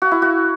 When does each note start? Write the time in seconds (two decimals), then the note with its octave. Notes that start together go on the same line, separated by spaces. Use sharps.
0.02 F#4
0.11 E4
0.22 F#4